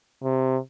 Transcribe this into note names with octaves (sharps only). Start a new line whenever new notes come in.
C3